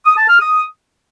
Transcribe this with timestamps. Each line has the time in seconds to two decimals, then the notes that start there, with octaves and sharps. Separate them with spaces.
0.06 D#6
0.17 A5
0.29 F6
0.40 D#6